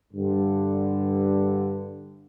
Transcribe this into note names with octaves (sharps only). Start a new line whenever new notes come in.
G2 D3